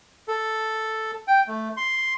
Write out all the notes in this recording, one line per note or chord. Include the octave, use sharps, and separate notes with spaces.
A4
G5
A3
C6